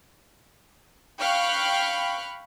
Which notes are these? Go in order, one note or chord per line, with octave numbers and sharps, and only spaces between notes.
F5 G5 B5 C#6 F6 F#6